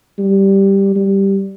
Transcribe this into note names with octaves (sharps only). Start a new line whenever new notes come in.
G3
G3